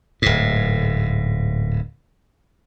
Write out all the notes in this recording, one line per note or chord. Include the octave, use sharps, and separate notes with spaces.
D1 G#2